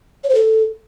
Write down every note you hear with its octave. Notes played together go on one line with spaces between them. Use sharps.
C#5
C5
A4